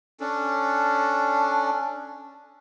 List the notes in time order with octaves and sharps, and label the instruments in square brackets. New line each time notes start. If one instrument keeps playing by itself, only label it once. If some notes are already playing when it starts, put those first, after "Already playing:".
[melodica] C#4 D4 A4